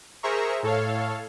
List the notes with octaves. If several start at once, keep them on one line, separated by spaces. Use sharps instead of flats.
G#4 A#4 C5 E5 A#5 C#6
A2 A4 C#5 F5